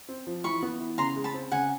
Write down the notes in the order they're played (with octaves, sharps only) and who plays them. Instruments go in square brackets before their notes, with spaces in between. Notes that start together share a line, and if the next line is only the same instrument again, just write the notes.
[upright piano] C4
F3
[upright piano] E3 [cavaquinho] B5 C#6
[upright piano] B3
E3
[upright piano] C#3 [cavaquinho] A#5 C6
[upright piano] G#3
[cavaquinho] A5 B5
[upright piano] C4
[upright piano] C#3 [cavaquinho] F#5 G#5